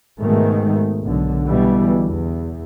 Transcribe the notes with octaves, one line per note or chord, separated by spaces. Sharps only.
G#2 B2 D#3 G#3 A3
B1 D3
B2 D3 E3 G3
E2